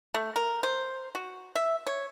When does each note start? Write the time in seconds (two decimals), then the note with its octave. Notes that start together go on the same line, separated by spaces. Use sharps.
0.14 A3
0.36 A#4
0.63 C5
1.15 F#4
1.55 E5
1.87 C#5